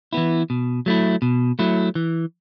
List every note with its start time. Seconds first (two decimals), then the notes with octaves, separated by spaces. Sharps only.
0.13 E3 B3 E4
0.50 B2
0.86 F#3 A3 E4
1.22 B2
1.59 F#3 A3 E4
1.95 E3